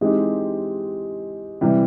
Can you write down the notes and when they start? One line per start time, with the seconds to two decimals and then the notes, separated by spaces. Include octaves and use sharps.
0.01 E3 G#3 C4 D#4 G4
1.61 C3 E3 G3